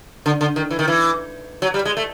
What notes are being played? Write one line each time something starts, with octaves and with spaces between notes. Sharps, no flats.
D3
D3
D#3
E3
D#3
E3
F#3
G3
G#3
A3